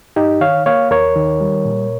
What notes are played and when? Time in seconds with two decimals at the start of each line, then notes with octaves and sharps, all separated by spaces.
0.16 G2 D#4 G4
0.41 D#3 C#5 F5
0.66 A#3 C#5 F5
0.91 D#2 A#4 C#5
1.16 D#3
1.41 G3
1.65 A#2